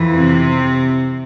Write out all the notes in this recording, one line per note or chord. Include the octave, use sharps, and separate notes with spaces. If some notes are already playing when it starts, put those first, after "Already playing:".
Already playing: F2 E3
C3 C4